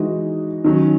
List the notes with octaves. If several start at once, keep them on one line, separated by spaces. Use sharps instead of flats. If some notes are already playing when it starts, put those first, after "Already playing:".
Already playing: E3 G#3 D#4 F#4
D#3 F#3 C#4